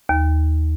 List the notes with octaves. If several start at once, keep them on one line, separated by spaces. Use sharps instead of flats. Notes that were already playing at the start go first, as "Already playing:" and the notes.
D#2